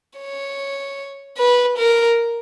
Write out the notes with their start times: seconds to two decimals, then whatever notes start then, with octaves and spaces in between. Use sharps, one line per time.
0.18 C#5
1.38 B4
1.78 A#4